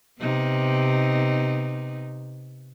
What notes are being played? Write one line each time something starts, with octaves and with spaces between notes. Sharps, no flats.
C3 B3 D#4